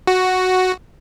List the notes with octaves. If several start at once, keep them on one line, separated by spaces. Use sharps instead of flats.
F#4